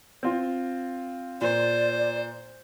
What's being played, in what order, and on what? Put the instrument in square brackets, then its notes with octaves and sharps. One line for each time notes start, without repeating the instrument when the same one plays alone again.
[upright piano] C4 F4
[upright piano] A#2 [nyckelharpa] C5 [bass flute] D5